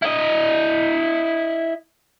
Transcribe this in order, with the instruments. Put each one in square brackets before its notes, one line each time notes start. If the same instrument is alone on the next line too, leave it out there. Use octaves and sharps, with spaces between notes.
[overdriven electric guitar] E4 D#5